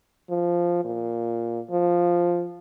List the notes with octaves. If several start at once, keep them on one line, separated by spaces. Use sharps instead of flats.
F3
A#2
F3